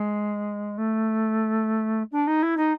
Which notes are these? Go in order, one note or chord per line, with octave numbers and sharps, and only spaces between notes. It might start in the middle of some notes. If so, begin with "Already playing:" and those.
Already playing: G#3
A3
D4
D#4
E4
D#4